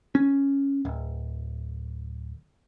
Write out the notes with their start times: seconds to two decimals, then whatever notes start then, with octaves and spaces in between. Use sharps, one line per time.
0.15 C#4
0.85 D1